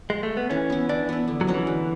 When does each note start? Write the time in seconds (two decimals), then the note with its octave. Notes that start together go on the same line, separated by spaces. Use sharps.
0.10 G#3
0.23 A3
0.37 B3
0.50 E3 C#4
0.70 B3 E4
0.89 E3 D4
1.09 B3 E4
1.28 D3
1.41 F#3
1.47 G#3 C#4 F#4
1.54 E3
1.67 D3